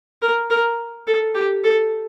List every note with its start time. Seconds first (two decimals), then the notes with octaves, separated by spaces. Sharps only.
0.22 A#4
0.50 A#4
1.07 A4
1.35 G4
1.64 A4